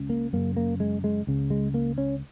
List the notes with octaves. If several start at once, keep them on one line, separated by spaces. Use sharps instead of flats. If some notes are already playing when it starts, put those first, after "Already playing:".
Already playing: C#2 C#3
A#3
F#2 C#3 A#3
A#3
G#3
G#3
C#2 C#3
G#3
A#3
C#4